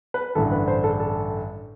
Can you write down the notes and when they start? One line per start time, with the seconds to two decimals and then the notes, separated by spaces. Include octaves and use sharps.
0.14 B4
0.35 A1 G2 D3 A4
0.52 B4
0.68 C5
0.84 A4
1.00 A4